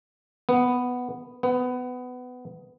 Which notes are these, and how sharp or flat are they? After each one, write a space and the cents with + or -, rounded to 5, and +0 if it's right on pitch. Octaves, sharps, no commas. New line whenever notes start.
B3 +5
B3 +20